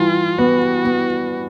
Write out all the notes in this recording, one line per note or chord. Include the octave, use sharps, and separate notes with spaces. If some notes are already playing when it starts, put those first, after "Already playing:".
Already playing: E3 G3 F4
B3 F#4
B3